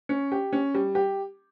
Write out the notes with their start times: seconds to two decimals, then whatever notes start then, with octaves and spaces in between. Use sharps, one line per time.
0.09 C#4
0.32 G4
0.53 C#4
0.74 G3
0.95 G4